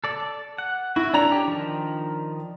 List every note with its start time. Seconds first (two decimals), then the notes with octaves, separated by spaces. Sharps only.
0.04 A4 D5
0.58 F#5
0.96 E4 F#4
1.13 C#4 D4 A4 A#5 F7
1.32 G4
1.48 D#3 F3